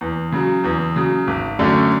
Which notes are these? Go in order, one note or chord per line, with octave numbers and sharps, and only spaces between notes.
E2
C#3 F#3
E2
C#3 F#3
G#1
F#2 D3 A3 C#4